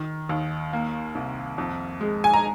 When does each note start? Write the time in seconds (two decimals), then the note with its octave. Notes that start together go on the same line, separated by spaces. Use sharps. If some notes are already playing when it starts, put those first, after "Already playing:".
Already playing: D#3
0.29 D#2
0.73 A#3
1.15 C2
1.58 F2
2.00 G#3
2.24 G#5
2.34 A#5